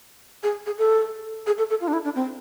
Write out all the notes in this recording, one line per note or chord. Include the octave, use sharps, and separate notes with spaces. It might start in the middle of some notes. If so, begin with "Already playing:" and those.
G#4
G#4
A4
G#4
A4
A4
F4
D4
E4
D4
C4